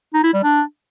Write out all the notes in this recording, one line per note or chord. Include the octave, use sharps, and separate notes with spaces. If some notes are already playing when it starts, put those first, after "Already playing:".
D#4
E4
G3
D4